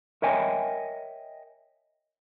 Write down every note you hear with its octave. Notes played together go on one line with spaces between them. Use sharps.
A#4 C#5 D#5 E5 G5 G#5